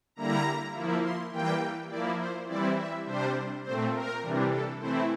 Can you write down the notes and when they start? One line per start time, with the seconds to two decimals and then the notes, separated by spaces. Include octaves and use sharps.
0.16 D3 G3 A#3 E4 A#5
0.74 F3 A#3 E4
1.03 C6
1.31 E3 G3 A#3 G5
1.90 F3 A#3 E4 D5
2.18 C5
2.48 E3 G3 C4 E4 D5
2.77 E5
3.06 C3 G3 D4 C5
3.64 A#2 A3 C4 C5
3.93 A#4
4.22 C3 E3 G3 D4
4.51 A4
4.79 E3 A3 C4 E4 C5